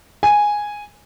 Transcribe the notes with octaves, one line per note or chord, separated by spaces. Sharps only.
G#5